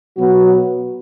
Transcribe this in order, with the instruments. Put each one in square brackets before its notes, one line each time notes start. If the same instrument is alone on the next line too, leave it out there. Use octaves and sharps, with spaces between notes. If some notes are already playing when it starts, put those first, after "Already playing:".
[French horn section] B2 F#3 B3 F#4